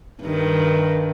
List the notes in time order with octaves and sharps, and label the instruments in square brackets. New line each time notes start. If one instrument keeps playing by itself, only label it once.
[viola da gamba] G2 D#3